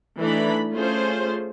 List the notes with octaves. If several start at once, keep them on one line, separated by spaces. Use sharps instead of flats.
E3 A3 D4 D#4 B5
A3 C#4 F4 G#4 C5